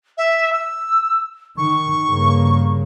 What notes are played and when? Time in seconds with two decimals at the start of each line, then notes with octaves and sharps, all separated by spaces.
0.17 E5
0.52 E6
1.57 D#3 C#6
2.05 G2 C#3 A#3